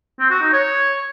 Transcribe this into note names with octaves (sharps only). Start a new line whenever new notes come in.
C4
F#4
D#4
C#5